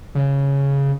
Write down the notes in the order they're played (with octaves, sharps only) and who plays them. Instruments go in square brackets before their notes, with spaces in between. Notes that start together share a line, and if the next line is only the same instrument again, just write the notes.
[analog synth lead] C#3